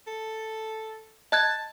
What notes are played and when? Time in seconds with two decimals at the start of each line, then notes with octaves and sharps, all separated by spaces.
0.07 A4
1.32 D#5 A5 F#6 G#6